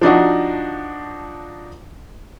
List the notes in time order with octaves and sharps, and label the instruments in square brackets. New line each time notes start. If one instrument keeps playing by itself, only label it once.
[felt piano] F3 D4 D#4 F#4